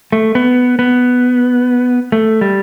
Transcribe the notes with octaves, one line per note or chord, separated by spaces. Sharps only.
A3
B3
B3
A3
G3